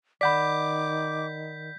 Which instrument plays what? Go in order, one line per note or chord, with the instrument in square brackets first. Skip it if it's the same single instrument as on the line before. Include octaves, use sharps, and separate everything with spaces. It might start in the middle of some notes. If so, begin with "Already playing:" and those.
[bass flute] D#3 [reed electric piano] D5 F#5 B5 [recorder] D6 [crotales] G6 B6